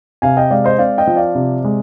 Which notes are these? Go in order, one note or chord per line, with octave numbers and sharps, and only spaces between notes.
C3 F5 G#5
D#5 G5
G#3 D5 F5
C5 D#5
C4 D5 F5
D#5 G5
F3
D5 F5
C3
G#3